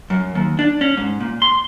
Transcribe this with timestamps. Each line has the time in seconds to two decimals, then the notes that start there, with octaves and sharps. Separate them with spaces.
0.10 F#2
0.35 D#2
0.59 D4
0.81 C#4
0.97 G#2
1.20 A#2
1.42 C6